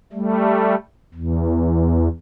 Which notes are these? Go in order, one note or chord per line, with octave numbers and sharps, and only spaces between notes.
G3 A3
E2